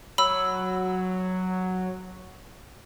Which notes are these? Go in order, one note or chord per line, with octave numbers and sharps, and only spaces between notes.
F#3 B5 E6